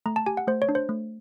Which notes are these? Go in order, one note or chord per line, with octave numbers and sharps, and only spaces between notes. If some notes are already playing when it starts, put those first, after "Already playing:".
A3 A#5
A5
G4 G#5
F#5
A3 C5
C#5
D4
C5
A3